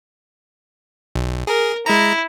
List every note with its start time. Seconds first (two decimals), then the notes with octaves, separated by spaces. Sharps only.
1.15 B1
1.47 G#4 A#4
1.86 G#3 E4 A#5